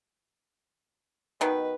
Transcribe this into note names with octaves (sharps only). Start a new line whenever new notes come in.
B2 D#3 B4